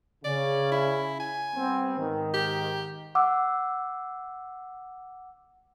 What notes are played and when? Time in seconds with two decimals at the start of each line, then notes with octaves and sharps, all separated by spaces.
0.25 C#3 C#4 D5
0.72 E4
1.20 G#5
1.55 G3 B3 C4
1.98 G#2 D#3
2.34 G4
3.15 F#5 D6 E6